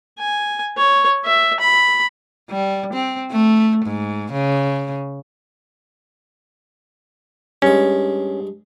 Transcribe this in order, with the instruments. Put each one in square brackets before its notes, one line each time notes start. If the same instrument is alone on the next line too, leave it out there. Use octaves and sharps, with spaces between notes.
[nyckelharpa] G#5
C#5
E5
B5
[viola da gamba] G3
C4
A3
G#2
C#3
[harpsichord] G2 G#3 [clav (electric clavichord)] C#4